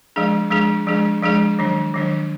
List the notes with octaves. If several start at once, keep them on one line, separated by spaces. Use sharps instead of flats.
F3 G#3 D4 G#4
F3 G#3 D4 G#4
F3 G#3 D4 G#4
F3 G#3 D4 G#4
D#3 F#3 D4
D#3 F#3 D4